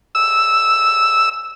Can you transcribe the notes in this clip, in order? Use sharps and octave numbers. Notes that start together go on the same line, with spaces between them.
E6